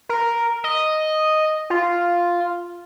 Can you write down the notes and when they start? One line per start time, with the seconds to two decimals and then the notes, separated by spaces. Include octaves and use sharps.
0.09 A#4
0.64 D#5
1.70 F4